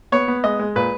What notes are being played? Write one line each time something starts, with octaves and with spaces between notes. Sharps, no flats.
B3 C#5
B3
G#3 D#5
G#3
A#2 B4